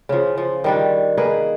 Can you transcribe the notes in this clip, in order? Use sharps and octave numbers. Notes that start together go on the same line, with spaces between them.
C#3 F3
F3
D#3 G3 D4
A#3 D#4 G#4 B4